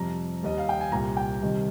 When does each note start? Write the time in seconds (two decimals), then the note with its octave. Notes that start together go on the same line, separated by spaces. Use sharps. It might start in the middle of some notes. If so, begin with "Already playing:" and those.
Already playing: F2 C3 G3 A#5
0.43 D#2 D#3 G3 D#5
0.58 F5
0.69 G5
0.81 G#5
0.92 C2 A#2 G3 A#5
1.17 G5
1.42 C2 C3 D#3 G3